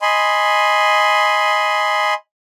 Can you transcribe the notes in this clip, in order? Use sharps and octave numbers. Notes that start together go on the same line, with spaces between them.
D#5 G#5 B5 C6